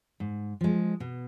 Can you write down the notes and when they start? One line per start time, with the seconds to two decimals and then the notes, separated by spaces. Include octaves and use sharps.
0.20 G#2
0.61 F3 G#3
1.00 B2